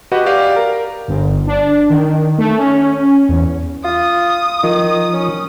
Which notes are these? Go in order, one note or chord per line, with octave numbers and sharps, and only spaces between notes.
F#4 G4 B4 D#5 F#5
G4 D5 F5
A#4
G1
D4
D#3
A3
C#4
E2
F4 D#6
D#3 F3
C#4